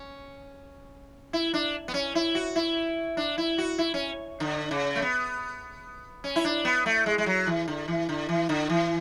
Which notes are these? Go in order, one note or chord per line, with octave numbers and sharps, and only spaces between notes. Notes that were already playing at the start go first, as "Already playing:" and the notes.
Already playing: C#4
E4
D4
B3
C#4
E4
F#4
E4
D4
E4
F#4
E4
C#4
D3
C#3
A3
B3
C#4
E4
D4
B3
A3
G#3
G#3
F#3
E3
D3
E3
D3
E3
D3
E3